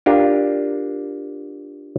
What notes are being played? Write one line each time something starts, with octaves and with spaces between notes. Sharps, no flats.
D4 F4 G4 A#4